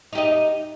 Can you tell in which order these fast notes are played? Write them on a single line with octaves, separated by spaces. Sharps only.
D#4 G4 D#5